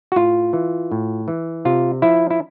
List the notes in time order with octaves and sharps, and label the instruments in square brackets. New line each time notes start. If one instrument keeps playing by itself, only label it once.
[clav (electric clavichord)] F#4
A2 F4
E3
A2
E3
C3 F4
F3 E4
E4